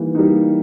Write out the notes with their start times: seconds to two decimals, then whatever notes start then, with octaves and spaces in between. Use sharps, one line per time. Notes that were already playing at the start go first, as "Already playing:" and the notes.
Already playing: E3 G3 A#3 D#4
0.15 G3 A#3 D#4